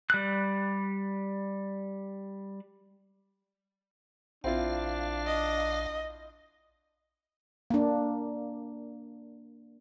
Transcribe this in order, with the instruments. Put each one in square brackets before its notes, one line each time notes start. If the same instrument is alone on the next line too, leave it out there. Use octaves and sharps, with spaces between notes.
[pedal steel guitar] G3 F#6
[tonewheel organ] A#1 F5 [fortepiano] C4 E4 F4 [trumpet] D4
[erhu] D#5
[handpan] A#3 D4